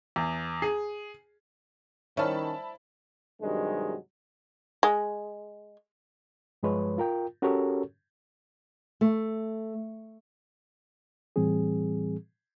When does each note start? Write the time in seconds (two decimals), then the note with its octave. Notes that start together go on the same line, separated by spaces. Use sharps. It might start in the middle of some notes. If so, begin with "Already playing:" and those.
0.16 E2
0.62 G#4
2.17 D#3 C#4 E4 C5 D5 A5 B5 F6
3.42 G2 C3 D#3 F#3 G#3
4.83 G#3
6.63 G2 F3 G#3 B4 C#5
6.98 F4 A#4 G5
7.42 C#4 F#4 G4 A4 A#4 C#5
9.01 A3
11.36 A2 E3 G3 C4 G#4